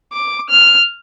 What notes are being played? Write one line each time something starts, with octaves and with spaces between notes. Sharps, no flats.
D6
F6